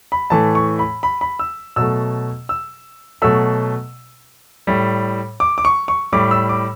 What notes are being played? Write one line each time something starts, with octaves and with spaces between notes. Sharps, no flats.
B5
A2 E3 A3 A5
C#6
B5
B5
B5
E6
B2 F#3 A3 E6
E6
B2 F#3 A3 E6
A2 G3
D6
D6
C#6
C#6
A2 G3 D6
E6
D6